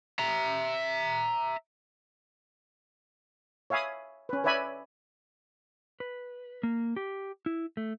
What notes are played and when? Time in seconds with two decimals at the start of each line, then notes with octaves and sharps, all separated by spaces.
0.19 E5 A#5
3.70 C#5 E5 F5 G#5 B5 D#6
4.29 C#4 B4
4.44 B4 C#5 D5 E5 G#5 B5
6.00 B4
6.63 A#3
6.96 G4
7.46 E4
7.77 A3